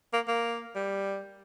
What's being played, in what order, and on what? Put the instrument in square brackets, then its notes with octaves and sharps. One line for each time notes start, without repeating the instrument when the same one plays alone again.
[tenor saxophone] A#3
A#3
G3